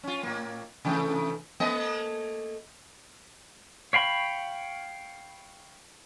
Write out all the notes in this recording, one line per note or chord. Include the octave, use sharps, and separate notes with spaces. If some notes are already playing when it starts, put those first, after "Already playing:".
C#4 F4
A2 A#3
C3 E3 A3
A3 A#3 D#5
C#5 F5 G5 B5 C#6